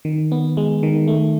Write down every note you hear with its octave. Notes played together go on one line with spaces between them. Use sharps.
D#3
B3
G#3
D#3
A3